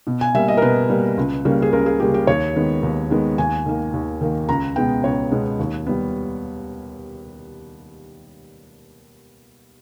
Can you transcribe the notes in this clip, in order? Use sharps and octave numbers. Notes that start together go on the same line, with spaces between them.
B2
G#5
G3 A#3 E5
D#5
A#4
B2 B4
G3 A#3
C#2
C#3 G3 A#3
G#4
C#2 A#4
G#4
C#3 G3 A#3 G4
G4
D#2 C#5
D#3 G#3 B3
D#2
D#3 G#3 B3
D#2 G#5
D#3 A#3
D#2
D#3 A#3
C#2 A#5
B2 G#3 B3 G5
C#2 C#5
B2 G#3 B3
D#2
G3 B3